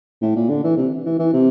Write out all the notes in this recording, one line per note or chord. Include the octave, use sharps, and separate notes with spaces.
A2
A#2
D3
E3
C3
E3
E3
C3